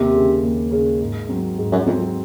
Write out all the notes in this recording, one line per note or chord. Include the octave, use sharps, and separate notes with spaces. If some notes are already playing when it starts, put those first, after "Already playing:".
Already playing: D#2 C3
C#3 G#3 C#4 G#4
D#2
C#3 G#3 C#4 G#4
G#2
F#3 C4
G#2
F#2
F2 F#3 C4